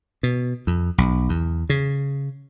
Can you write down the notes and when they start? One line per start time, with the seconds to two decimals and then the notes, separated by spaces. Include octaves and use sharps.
0.23 B2
0.67 F2
0.98 B1
1.29 E2
1.70 C#3